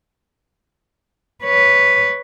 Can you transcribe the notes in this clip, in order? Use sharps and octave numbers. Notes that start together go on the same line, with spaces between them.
B4 C#5